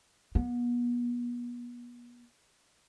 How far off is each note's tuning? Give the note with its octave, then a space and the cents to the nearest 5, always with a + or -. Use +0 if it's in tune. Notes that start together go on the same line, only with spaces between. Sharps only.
B3 -35